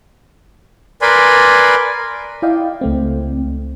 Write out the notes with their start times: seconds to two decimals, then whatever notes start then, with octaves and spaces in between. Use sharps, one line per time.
1.02 A#4 B4 D5 G#5 B5 C6
2.42 E4 D5 D#5 F5 G5
2.81 C#2 A3 C4